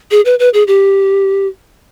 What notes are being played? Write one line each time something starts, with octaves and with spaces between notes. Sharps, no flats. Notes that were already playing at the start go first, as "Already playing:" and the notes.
G#4
B4
B4
G#4
G4